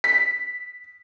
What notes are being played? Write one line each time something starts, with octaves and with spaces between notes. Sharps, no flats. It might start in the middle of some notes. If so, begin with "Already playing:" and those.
B6